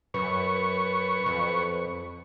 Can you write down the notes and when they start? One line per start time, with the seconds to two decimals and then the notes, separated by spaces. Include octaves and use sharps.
0.14 F#2 B4 C#6
1.26 F2